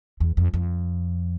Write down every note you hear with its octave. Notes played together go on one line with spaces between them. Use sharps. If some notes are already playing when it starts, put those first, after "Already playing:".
E2
F2
F2